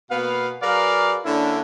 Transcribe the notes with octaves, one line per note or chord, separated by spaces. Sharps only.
B2 A#3 B3 B4 F5
F#3 G#4 A#4 B4 D5 F5
D3 A#3 C#4 D4 E4